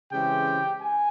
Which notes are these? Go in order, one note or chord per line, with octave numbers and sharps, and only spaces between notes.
C#3 E3 G#3 C4 G4 G5
G#5